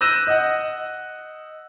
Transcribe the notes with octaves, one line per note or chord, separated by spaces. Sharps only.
E6 F#6 G6 A#6 D#7 E7
D#5 F#5